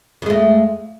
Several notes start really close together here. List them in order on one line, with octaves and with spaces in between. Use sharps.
F2 G#3 A3